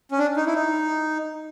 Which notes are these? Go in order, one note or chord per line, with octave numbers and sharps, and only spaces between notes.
C#4
D4
D#4
E4
D#4